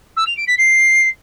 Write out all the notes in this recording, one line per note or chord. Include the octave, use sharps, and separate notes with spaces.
E6
F7
D7
B6
C7